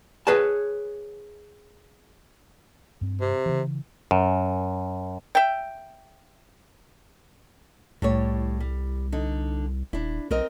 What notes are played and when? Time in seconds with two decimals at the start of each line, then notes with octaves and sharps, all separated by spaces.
0.27 G#4 B4 C#5 A5
3.01 G2 C4
3.21 C3
3.46 C#3 E3
4.11 F#2
5.35 E5 G5
8.02 C2 A2 G3 C#5
8.60 G3
9.12 D3 D#4
9.93 D#1 D4 E4
10.31 B1 C4 A#4 D#5